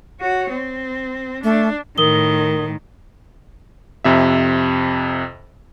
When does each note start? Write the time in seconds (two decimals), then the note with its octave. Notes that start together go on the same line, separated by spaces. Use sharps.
0.20 F#4 C#5
0.50 C4
1.44 A3 D4
1.98 A2 D#3 A#4 D#6 G7
4.04 F2 C3 E5